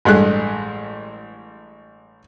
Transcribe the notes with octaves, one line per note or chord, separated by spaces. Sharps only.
A1 G2 G#3 A3 G#4 F#6